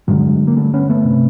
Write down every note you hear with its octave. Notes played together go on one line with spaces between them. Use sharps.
G2 D3 F#3 G#3
A#3
G3 A3
B3 C#4
A3 B3
C3